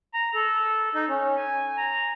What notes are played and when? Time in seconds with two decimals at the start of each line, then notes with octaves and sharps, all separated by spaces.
0.14 A#5
0.35 A4
0.95 D#4
1.09 C#4
1.37 G#5
1.77 A#5